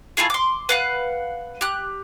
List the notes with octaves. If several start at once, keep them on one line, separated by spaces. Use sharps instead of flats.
A3 E4 F4 G#4
C6 D6
B4 F5 F#5
G4 F#6